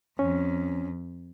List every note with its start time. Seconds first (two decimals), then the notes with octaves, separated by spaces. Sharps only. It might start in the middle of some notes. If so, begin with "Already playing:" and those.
0.19 F2 C#4